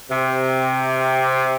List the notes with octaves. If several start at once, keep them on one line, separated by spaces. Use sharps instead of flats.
C3